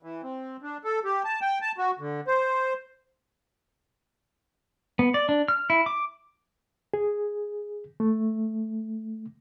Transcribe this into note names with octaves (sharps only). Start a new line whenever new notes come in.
E3
C4
D4
A4
G4
A5
G5
A5
F#4
D3
C5
B3
D5
D4
F6
E4
D6
G#4
A3